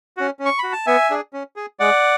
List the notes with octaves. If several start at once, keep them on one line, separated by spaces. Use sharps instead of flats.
C#4 F#4
C#4
C#6
F#4 B5
A5
B3 E5 G#5
D4 G#4
C#4
G#4
G#3 D5 F#5